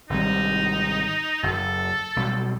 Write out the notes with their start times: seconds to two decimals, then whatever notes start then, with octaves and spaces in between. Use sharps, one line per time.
0.10 G#1 C3 G3 D#4
1.43 F#1 F#2 A4
2.16 B1 B2 G3